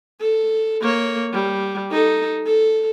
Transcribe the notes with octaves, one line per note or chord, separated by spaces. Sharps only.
A4
A#3 C#5
G3
D#4 A4
A4